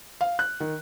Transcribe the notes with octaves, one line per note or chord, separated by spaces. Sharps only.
F5
F#6
D#3